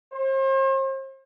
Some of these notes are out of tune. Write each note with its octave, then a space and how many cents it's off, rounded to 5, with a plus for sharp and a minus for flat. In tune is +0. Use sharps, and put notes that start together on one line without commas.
C5 +40